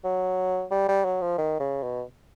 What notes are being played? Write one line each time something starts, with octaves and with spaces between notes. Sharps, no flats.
F#3
G3
G3
F#3
F3
D#3
C#3
B2